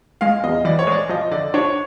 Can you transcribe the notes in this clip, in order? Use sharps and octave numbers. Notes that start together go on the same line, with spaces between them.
G#3 F5
E2 D#5
E3 D5
C#5
G#3 D5
F3 D#5
D3 D5
D4 C#5